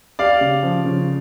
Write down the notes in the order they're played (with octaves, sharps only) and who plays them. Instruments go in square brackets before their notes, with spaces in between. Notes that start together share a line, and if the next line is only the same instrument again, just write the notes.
[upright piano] G4 [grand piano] D5 F5
[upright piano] C#3
F3
C#3